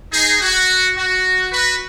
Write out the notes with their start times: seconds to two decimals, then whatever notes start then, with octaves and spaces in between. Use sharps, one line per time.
0.13 D#4 G#4
0.41 F#4
0.97 F#4
1.52 F#4 B4